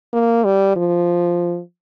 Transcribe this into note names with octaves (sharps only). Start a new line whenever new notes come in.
A#3
G3
F3